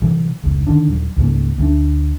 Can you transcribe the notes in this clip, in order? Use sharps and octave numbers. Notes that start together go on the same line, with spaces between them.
C3 E3 F#3
F1 C#2
D3 D#3 D4
D#1 F#3
C#2 G#2 C#3 A#3
D2 G#3 D4